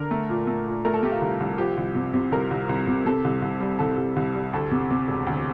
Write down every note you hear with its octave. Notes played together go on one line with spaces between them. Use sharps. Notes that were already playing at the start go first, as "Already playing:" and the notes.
Already playing: D3 A#4
A3
A#2
A3
A#2
A3 A#4
A4
A3 G4
F4
C2
C2
F3 G4
C2
C3
C3
C2 A#4
C2
C2
C3
C3 A4
C2
C2
G3
C2 A4
C2
C2
G3
D2 A4
C3
C3
E1
D2